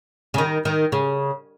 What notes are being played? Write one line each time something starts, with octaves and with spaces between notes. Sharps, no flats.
C#3
D#3
D#3
C#3